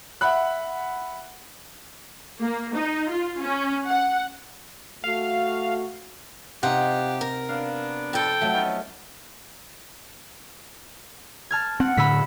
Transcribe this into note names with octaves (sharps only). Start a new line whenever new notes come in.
E5 F#5 B5 F#6
A#3
D#4
F4
C#4
F#5
A3 F#4 F5
C3 D#4 F4 G4 F#5
A#4
B3 D4 F5
F2 A4 G5
F#3 A3
B3 C#4 D#4
A5 F6 G#6
C4 F#5
A2 D3 B5 E6 B6